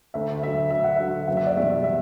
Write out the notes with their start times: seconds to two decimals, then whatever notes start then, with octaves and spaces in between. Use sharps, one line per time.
0.14 D2 E5
0.43 D3 F#3 E5
0.71 D2 E5
0.84 F#5
0.96 D3 F#3 E5
1.27 F#1 F#5
1.37 E5
1.47 D5
1.56 E2 B2 G3 E5
1.84 E5